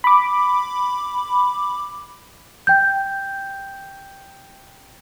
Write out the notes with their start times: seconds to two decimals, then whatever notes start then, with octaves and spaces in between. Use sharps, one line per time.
0.04 B5 D6
2.67 G5 G6